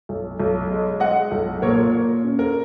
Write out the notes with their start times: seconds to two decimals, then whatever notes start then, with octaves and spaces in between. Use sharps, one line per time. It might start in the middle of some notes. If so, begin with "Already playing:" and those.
0.09 B1
0.40 B1
0.70 G#3
1.00 G#3 D#5 F#5
1.31 B1
1.62 A#2 A#4 C#5
1.93 A#2
2.24 C#4
2.39 A#4